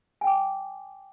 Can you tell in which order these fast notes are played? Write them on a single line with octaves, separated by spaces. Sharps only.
G#5 G5 D6